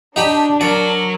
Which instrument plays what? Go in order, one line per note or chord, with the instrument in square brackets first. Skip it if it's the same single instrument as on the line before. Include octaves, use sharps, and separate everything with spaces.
[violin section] D4 [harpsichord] D#4 G4 B5
[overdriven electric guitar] F#3 F#4 [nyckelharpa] A#4 [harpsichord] D5